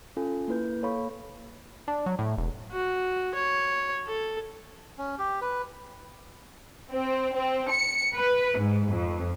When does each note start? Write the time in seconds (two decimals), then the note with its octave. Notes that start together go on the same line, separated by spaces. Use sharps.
0.17 C#4 F4 A4 G#5
0.48 A#3 E4 B4 G6
0.82 A#3 A4 C#5 F5 B5 C#6
1.88 D4
2.06 F#3
2.19 A2
2.38 E1
2.72 F#4
3.35 C#5
4.06 A4
4.98 C#4
5.18 G4
5.41 B4
6.92 C4
7.35 C4
7.70 C#7
8.16 B4
8.60 G#2
8.91 F2